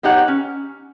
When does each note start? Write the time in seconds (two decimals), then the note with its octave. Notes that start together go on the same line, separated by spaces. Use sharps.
0.03 B3 D#4 G4 C#5 F#5
0.28 C#4